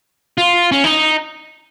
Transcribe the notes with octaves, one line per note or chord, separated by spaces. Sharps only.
F4
C#4
D#4